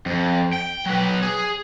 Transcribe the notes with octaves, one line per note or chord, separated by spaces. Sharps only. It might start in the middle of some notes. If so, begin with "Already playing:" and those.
F2
G5
F#3 B4
G#4